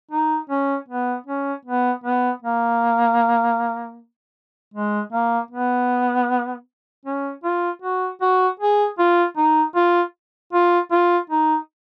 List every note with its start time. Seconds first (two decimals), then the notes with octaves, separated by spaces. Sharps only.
0.11 D#4
0.50 C#4
0.88 B3
1.27 C#4
1.65 B3
2.04 B3
2.42 A#3
4.74 G#3
5.13 A#3
5.51 B3
7.06 C#4
7.44 F4
7.82 F#4
8.21 F#4
8.60 G#4
8.99 F4
9.37 D#4
9.75 F4
10.53 F4
10.92 F4
11.30 D#4